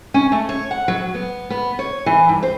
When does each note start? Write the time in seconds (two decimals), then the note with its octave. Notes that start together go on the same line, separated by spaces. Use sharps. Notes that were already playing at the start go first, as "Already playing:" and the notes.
0.14 C#4
0.32 A3
0.49 C#5
0.71 F#5
0.88 F#3
1.14 B3
1.50 B3
1.79 C#5
2.06 E3
2.29 G2
2.43 C5